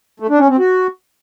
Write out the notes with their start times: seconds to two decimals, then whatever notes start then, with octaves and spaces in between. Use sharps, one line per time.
0.20 A3
0.30 D4
0.39 C#4
0.49 C4
0.58 F#4